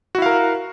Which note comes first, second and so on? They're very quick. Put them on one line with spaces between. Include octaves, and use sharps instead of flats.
F#4 E4 F5 A#4